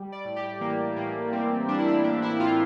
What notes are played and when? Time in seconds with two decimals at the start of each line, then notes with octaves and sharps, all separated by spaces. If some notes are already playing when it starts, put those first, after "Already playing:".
Already playing: G3
0.12 D5
0.25 A2
0.36 G4
0.61 E3 A#3
0.96 A2 A#3
1.32 G3 C4
1.68 G3 D4
1.78 E4
1.88 D4
2.04 A2 D4
2.22 E4
2.40 A2 F4